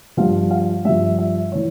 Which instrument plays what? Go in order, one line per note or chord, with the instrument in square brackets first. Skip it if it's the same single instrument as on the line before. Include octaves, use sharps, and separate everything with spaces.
[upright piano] G2 F3 F5
F5
G2 F3 E5
E5
E3 C#5